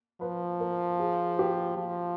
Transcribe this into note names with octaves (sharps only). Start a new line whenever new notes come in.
F3 B4
A#4
G#4
G4
F3